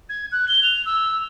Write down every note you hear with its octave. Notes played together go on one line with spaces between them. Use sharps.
G#6
F#6
G7
F7
E6